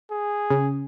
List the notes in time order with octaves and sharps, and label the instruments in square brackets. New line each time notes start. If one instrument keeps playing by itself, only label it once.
[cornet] G#4
[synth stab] C#3